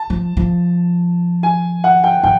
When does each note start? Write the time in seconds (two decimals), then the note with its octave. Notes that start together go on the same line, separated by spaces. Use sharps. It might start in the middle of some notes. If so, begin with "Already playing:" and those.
Already playing: A5
0.10 F3
0.37 F3
1.43 G#5
1.84 F#5
2.04 G5
2.23 F3 G5